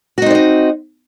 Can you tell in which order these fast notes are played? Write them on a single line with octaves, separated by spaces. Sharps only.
F#4 D#4 C4 D5 D#5